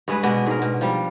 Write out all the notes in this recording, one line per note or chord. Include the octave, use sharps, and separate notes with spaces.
G2 G#3 G#4 B4
B2 G#3 D4 F#4
G#2 A#4
B2
F3 G3